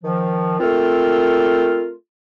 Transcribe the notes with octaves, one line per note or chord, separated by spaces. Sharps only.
D#3 F3
A3 C4 F4 A#4